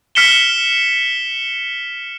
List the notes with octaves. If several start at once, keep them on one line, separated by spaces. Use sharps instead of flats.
F6 B6 C#7 E7 G7